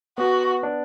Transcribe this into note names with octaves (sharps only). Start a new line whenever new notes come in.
B3 F#4
D4